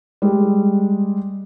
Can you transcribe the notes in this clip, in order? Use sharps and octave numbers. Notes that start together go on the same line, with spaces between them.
G3 G#3